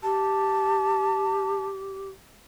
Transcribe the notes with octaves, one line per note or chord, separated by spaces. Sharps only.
G4 A5